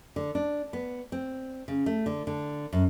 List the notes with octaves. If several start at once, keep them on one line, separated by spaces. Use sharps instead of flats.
D3
D4
B3
C4
C#3
A3
D3
D3
F#2